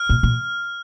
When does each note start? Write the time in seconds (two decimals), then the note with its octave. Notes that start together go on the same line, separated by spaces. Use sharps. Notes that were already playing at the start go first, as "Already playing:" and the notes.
Already playing: F6
0.09 A#2
0.23 A#2